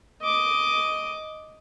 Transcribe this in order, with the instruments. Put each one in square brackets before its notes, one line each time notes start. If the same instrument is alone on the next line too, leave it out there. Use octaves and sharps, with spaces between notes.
[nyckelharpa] D#5 D6